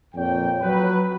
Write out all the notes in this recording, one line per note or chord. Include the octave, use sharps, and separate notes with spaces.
F2 A#2 C#5 G5
F#3 B4